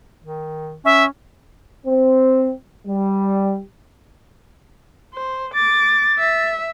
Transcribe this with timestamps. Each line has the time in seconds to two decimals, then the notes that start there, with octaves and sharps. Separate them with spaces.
0.24 D#3
0.85 C#4 E5
1.86 C4
2.87 G3
5.14 C5
5.54 D6 A6
6.18 E5